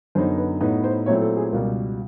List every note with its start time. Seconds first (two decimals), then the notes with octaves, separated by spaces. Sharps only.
0.15 F#2 D3 F#3 B3 D#4 C5
0.38 B4
0.60 A2 F#3 B3 D#4 B4
0.84 C5
1.06 A#2 F#3 A3 C4 E4 C#5
1.22 A4
1.37 G#4
1.52 C#2 B2 G3 A#4